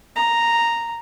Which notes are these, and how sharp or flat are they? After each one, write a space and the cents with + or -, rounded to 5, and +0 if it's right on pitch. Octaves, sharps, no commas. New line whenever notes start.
A#5 -5